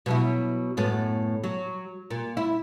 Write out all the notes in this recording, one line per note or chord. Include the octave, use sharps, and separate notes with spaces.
B2 F#3 E4
F#2 A2 B3
F#3
A#2
E4